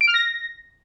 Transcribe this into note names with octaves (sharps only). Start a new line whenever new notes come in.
D7
F6
A#6